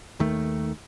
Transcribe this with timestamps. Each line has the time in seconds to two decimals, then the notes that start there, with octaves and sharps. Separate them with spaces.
0.19 D#2 D#3 A3